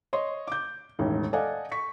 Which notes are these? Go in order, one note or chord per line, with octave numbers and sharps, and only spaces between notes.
C#5 D#5 C6
D6 G6
E1 A1 D#3
A4 D5 D#5 F5 F#5 G#5
C#6 B6